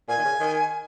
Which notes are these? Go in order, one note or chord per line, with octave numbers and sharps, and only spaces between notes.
A#2 G#5
D#3
C#3
D#3